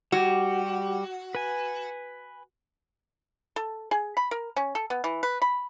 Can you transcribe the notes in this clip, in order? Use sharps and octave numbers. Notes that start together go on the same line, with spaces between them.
G3 F#4 G4
B4 G#5
A4
G#4
B5
A#4
C#4
A4
B3
E3
B4
B5